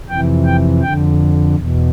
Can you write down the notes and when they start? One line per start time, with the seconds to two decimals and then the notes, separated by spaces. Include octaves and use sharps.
0.09 F2 C3 E3 G5
0.45 G5
0.82 F2 D3 G5
1.55 E2 B2